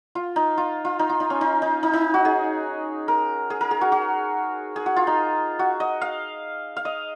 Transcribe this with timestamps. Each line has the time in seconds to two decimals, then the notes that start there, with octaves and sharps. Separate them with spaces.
0.15 F4
0.36 D#4
0.57 F4
0.85 F4
0.99 D#4
1.09 F4
1.20 D#4
1.30 C#4
1.41 D#4
1.62 D#4
1.83 D#4
1.93 D#4
2.14 F#4
2.25 G#4
3.08 A#4
3.50 G#4
3.61 A#4
3.71 G#4
3.81 F#4
3.92 F#4
4.76 G#4
4.86 F#4
4.96 F4
5.07 D#4
5.59 F#4
5.80 D#5
6.01 F5
6.77 F5
6.85 D#5